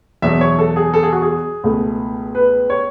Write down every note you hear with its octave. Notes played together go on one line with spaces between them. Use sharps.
E2 B2 F#3 E5
C#5
A4
G#4
A4
G#4
F#4
G#4
C#2 B2 A3
B4
C#5